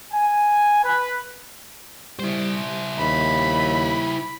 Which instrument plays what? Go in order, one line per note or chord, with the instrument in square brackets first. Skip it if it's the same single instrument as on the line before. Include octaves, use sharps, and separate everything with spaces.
[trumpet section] G#5
B4
[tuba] G3 [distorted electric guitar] E4 C5
[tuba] D#2 [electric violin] B5